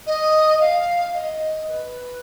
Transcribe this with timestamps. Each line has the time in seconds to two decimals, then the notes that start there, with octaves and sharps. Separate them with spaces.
0.06 D#5
0.60 F5
1.14 D#5
1.68 B4